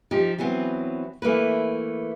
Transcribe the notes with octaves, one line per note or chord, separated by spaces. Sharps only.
F3 D#4 G4
E3 F#3 B3 C4
E3 A3 A#3 B4